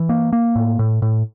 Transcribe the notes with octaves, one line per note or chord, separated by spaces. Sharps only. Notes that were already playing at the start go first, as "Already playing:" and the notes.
Already playing: E3
A#3
A#3
A2
A2
A2